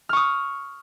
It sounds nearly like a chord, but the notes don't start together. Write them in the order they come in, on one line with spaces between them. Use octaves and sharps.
F6 C#6 D#6